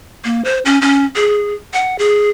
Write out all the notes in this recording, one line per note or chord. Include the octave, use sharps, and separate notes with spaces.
A#3
C5
C#4
C#4
G#4
F#5
G#4